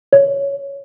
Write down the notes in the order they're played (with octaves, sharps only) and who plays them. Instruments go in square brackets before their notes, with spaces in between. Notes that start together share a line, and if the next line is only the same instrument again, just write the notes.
[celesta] C#5